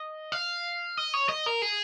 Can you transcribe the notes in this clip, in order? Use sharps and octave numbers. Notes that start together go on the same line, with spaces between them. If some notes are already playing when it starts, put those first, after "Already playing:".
Already playing: D#5
F5
D#5
C#5
D#5
A#4
G#4